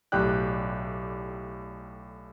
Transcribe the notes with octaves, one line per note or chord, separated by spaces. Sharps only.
B1 A2 G4 D5 G5 F#6